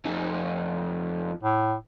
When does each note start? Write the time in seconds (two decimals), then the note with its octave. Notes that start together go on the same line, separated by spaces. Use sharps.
0.05 F2 D#4
1.43 A2